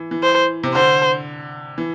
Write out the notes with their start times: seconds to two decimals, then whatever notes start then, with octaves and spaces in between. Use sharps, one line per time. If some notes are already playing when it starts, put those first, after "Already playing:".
Already playing: E3
0.11 E3
0.23 C5
0.64 C3
0.75 D3 C5
1.78 E3